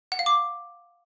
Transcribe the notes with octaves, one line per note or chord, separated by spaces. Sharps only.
F#5
F5
D6